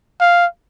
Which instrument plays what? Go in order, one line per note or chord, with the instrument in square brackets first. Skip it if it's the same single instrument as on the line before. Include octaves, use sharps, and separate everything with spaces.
[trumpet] F5